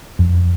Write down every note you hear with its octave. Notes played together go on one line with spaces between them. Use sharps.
F2